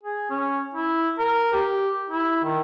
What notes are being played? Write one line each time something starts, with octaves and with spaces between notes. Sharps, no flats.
G#4
C#4
E4
A#4
G4
E4
D#3